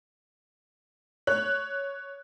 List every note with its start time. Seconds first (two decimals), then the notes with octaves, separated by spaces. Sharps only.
1.27 C#5 F#6